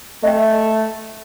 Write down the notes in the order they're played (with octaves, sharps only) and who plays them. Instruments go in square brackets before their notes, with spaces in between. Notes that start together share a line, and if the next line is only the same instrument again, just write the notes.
[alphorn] A3 [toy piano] D#5 E5 G5